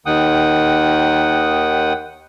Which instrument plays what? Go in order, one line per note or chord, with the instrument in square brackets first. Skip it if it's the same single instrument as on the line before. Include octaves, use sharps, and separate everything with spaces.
[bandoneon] D#2 D#3 F#5 G5 D#6